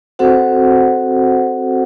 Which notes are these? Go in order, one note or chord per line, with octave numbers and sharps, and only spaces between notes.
C4 F#4 A4 C5 F#5